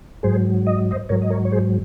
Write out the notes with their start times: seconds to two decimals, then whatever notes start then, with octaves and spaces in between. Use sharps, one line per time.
0.23 G#2 F#3 G#4 C5
0.67 D#5
0.91 C5 D#5
1.09 G#2 F#3 A#4 C#5
1.22 D#5
1.30 A#4 C#5
1.45 C#5
1.52 G#4 C5